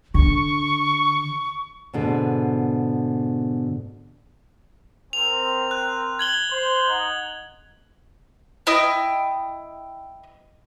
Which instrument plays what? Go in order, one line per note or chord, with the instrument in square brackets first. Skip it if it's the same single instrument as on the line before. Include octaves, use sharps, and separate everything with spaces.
[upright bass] D3 [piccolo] C#6
[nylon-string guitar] G#2 B2 D3
[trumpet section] C4 A#4 [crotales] F7
[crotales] F#6
G#6 F#7 G7
[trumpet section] C5
D#4 F#5
[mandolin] E4 D#5 G5 D#6